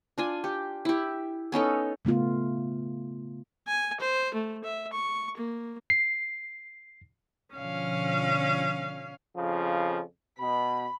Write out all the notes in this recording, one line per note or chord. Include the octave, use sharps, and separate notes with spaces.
D4 F4 G#5
G4
E4 G4
B3 C#4 D#4 A4
C#3 A3 B3 F4
G#5
C5
A3
E5
C#6
A#3
C7
B2 D3 F3 C#4 F5
F2 C#3 F3
B2 B5